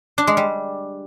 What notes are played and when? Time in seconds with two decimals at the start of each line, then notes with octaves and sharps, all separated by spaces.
0.18 D4
0.27 G#3
0.37 G3